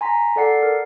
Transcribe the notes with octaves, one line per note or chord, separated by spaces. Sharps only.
G#5 A#5 C6 B6
A4 D5 F#5 C7
A#4